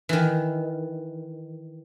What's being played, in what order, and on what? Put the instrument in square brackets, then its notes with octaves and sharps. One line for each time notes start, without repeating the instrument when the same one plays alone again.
[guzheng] D#3 E3